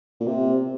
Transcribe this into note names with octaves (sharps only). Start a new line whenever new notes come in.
A#2
C3